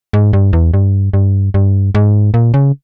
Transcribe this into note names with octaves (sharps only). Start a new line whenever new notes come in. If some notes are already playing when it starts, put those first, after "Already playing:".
G#2
G2
E2
G2
G2
G2
G#2
A#2
C#3